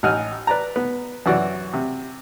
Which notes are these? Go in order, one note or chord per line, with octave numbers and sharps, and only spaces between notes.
A1 D#4 F#5 G#5 F6
B4 D5 A#5
B3
F#2 E3 F#4 D5
C3